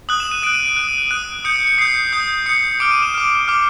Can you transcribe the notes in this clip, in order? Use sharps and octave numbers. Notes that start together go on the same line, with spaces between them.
D#6 F#6 F#7
E7
D#7
D#6 F#6 D7
D#7
D7
D#6 F#6 D#7
D#7
D#7
D#6 F#6 D7
D#6 G6 C#7
C#7
C#7
D#6 G6 C7
D#6 G6
D#6 G6 C#7
D6 F6 D7
D#7
E7
D6 F6
D6 F6